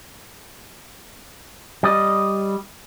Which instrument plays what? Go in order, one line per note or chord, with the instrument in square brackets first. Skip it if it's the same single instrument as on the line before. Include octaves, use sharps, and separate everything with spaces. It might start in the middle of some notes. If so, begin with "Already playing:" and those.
[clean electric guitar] G3 D5 D#5